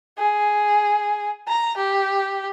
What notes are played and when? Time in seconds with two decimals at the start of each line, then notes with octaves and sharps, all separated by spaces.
0.18 G#4
1.48 A#5
1.77 G4